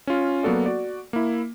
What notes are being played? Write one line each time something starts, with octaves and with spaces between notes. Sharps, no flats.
C#4 F4
F#3 A#3 B3 F#4 A4 D5
F#4 D5
A#3 E4